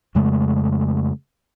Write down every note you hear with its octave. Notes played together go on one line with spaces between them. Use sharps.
F2 C#3 G#3 A3